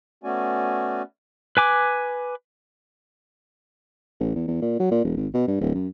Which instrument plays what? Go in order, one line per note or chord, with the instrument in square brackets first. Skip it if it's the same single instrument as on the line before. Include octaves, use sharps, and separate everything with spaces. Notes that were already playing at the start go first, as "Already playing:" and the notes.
[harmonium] A3 B3 C#4 F#4 D5 G#5
[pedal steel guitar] B4 G#5 D6
[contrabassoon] A1
E2
E2
A#2
F#3
A#2
E1
G#1
B2
G2
D1
F#2